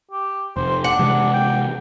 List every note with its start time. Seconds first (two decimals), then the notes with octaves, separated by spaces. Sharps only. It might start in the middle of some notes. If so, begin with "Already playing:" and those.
0.11 G4
0.56 F1 C5
0.84 D4 F#5
0.99 C3 E3 G#3
1.34 G5